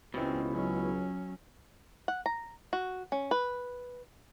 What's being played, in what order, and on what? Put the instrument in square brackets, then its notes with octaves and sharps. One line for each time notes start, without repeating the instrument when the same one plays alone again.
[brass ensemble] C#2 [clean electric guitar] B2 E3 [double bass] C4 C#4
[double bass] F#3 C#4
[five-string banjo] F#5
A#5
F#4
C#4
B4